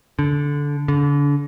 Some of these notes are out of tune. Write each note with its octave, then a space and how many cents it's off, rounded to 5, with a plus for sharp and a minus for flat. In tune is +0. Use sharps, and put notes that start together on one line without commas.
D3 -15
D3 -40